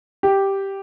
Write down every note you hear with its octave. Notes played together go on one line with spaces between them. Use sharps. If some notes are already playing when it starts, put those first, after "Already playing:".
G4